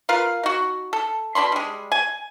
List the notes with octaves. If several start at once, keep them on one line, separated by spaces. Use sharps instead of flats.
F4 A#4 B4 F5
D#4 F#4
A4
B2 D4 B5 C6
G3 G#3
G#5